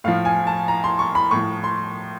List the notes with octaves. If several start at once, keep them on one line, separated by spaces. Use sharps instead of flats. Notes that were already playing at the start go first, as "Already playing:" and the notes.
A2 F3 F5
G#5
A5
A#5
C6
C#6
B5
A2 F3 C#6
C6